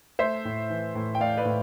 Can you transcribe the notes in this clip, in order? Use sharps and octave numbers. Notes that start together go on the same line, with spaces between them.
A3 C5 E5
A2
E3
A2
G5
A3 D5 F5
B4 D5
A2